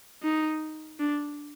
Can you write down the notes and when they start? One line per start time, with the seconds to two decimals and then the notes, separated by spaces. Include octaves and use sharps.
0.23 D#4
0.99 D4